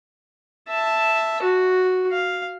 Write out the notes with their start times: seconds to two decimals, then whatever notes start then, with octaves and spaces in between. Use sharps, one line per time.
0.69 E5 A5
1.42 F#4
2.12 F5